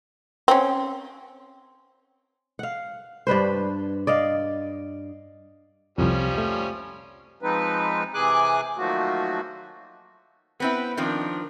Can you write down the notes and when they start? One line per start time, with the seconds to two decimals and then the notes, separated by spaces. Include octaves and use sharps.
0.48 C4 C#4
2.59 F5 F#5
3.27 G2 D4 B4 C5
4.07 D5 D#5 F5
5.98 C2 F2 F3 G3 C#4
6.38 A3
7.43 F3 G#3 C4 D#4 B4
8.14 C3 E3 G#4 G#5 D6 F#6
8.78 D#3 F3 F#3 A3 A#3 F#4
10.60 B3 C4 E4 B4
10.97 D#3 F3 C4 D4 A#4